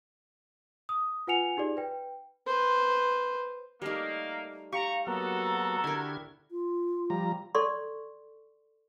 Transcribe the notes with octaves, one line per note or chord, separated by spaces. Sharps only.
D#6
F4 B4 F#5 G#5 C#7 F7
D#4 G4 G#4 D5
B4 G5
B4 C5
G3 A3 A#3 D#4
G4 F5 A#5 C#6
F#3 A#3 B3 F#4 A4 A#5
D3 E4 G4 A#4 G#6
F4
F3 G3 A#5
A4 D5 C6 C#6